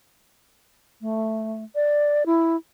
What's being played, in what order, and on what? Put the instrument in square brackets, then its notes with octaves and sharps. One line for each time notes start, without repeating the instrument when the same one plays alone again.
[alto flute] A3
D5
E4